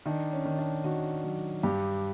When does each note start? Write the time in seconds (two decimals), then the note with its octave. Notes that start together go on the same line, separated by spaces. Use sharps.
0.06 D#3 D4
0.33 C#4
0.45 D#3
0.58 D4
0.84 D#3 F#4
1.24 F#3
1.63 G2 G4